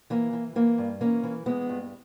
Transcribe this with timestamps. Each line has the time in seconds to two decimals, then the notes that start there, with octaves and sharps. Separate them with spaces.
0.10 E3 A#3
0.33 E3
0.56 E3 A#3
0.78 G2
1.01 E3 A#3 C#4
1.24 E3
1.46 E3 G#3 B3
1.69 G2